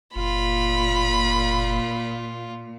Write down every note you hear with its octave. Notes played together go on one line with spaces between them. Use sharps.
F#1 A#2 F4 B5